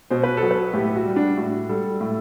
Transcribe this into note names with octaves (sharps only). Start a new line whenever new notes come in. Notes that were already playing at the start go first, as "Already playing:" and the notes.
B2 C5
B4
A4
F#3
B4
A2 G4
F#4
G3
D4
A2 F#4
G3 A4
A2